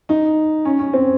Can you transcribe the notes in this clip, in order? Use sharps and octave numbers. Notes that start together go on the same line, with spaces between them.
D#4
C#4
C#4
C4